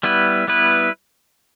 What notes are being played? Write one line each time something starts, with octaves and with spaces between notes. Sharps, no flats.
G3 B3 E4 B4
G3 B3 E4 B4